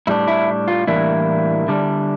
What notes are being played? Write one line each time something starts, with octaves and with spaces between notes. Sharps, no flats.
A2 G3 D4 E4
E4
F4
A2 E3 G3 A#3 D4 E4
D3 G3 D4